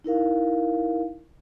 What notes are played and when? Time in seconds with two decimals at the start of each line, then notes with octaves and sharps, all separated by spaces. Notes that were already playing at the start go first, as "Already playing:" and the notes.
0.04 D#4 E4 A#4 F5